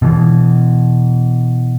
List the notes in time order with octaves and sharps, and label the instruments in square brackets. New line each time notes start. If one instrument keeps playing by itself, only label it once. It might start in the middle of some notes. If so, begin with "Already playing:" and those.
[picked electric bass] B2 E3